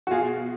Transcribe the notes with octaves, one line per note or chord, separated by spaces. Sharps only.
F#4
B2 F4 G#4